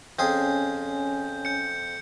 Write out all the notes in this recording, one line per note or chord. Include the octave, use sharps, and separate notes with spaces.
F2 C4 C#4 G#4 C#5 G#5 G6
G6 C#7